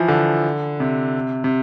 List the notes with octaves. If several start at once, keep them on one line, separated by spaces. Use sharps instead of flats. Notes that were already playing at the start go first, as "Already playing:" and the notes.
Already playing: E3 F3
D3
C3
C3